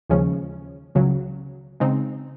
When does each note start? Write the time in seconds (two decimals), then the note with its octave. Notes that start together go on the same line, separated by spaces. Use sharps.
0.10 D#2 C#3 F3 G#3 C#4
0.95 C#2 C#3 F#3
1.80 C#3 G#3 C4 D#4